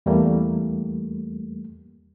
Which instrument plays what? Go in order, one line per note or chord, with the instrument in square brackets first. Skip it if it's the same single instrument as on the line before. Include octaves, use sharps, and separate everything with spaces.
[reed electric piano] E2 G3 A3 A#3